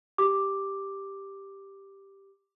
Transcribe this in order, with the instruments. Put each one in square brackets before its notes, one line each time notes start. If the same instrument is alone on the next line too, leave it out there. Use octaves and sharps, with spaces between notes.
[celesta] G4 D6